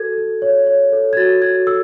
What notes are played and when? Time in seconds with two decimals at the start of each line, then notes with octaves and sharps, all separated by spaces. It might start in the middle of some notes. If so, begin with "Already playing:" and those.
Already playing: F#4 A4 G#6
0.18 A4
0.42 C#5
0.67 C#5
0.92 A4
1.13 G#6
1.17 F#4 A6
1.42 F#4 G#6
1.67 A4 E6